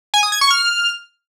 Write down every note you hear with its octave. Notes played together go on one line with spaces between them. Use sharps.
G#5
D#6
G#6
C#6
F6